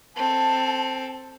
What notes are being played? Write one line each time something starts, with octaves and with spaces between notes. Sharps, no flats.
C4 A4 A5